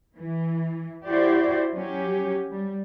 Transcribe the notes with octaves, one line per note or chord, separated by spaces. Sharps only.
E3
E4 F#4 G4 C5 D5
F#3 C#4 G4
G3